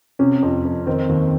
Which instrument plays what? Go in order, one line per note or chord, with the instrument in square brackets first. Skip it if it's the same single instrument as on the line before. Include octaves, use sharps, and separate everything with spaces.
[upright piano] C3 C#4
F2
F2
D#3 C4
D#2